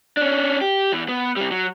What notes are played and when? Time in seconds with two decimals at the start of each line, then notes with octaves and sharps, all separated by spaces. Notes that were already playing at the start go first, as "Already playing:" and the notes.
0.17 C#4 D4
0.61 G4
0.92 E2 E3
1.09 B3
1.37 C3 G3
1.51 F#3